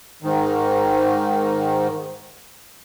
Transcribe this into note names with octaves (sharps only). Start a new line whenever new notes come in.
G#2 D#3